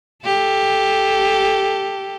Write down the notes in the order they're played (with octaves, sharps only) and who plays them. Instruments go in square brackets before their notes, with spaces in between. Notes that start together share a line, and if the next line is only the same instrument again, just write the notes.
[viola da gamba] G4 A4